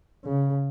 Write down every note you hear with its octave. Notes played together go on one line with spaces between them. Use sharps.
C#3